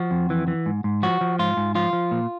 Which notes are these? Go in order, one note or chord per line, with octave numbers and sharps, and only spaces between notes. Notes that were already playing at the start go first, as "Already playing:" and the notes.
Already playing: F3 F#4
F2
E3
E3
G#2
G#2
F3 F#4
F3
G#2 F4
G#2
F3 F4
F3
A#2